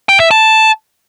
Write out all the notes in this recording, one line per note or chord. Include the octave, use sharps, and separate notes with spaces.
G5
E5
A5